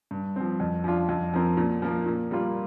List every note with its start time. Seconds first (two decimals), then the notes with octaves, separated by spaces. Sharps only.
0.11 G2
0.36 F3 C4
0.60 F2
0.84 F3 D4 F4
1.09 F2
1.34 F3 C4 A#4
1.57 A#2
1.82 F3 A#3
2.06 A#2
2.31 G3 A#3 F4